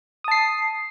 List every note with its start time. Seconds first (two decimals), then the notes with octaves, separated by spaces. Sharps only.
0.24 D#6
0.28 A5
0.32 C7